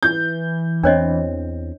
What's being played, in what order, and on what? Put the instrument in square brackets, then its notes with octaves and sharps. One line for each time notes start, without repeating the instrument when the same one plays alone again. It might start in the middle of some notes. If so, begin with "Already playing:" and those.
[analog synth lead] E3 [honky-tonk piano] G6
[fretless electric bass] E2 B3 C4 [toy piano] D4 C#5 D#5